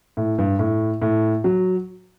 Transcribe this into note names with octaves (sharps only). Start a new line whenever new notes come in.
A2
G2
A2
A2
F#3